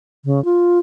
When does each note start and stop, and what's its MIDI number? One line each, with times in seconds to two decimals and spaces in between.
0.25 0.43 49
0.45 0.79 65